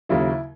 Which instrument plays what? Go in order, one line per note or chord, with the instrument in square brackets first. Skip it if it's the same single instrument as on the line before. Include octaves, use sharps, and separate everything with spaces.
[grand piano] D#2 C#3 F#3 E4